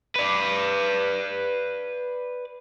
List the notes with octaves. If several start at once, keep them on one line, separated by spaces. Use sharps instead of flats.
B4 D5